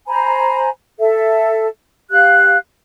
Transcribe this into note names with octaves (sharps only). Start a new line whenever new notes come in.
C5 G#5 A#5 B5
A4 E5
G4 F5 F#6